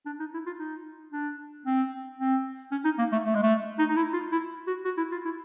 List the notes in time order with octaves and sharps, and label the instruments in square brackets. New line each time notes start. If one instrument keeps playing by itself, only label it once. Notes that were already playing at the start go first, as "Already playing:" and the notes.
[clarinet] D4
D#4
E4
F4
D#4
D4
C4
C4
C#4
D#4
A#3
A3
A3
G#3
A3
D#4
D#4
E4
F4
E4
F#4
F#4
E4
F4
E4